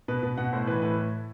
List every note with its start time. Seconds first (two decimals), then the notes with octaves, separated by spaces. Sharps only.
0.08 B2 B4
0.23 B2 B4
0.38 B2 F#5
0.53 A2 C5
0.67 E3 B4
0.82 A2 B4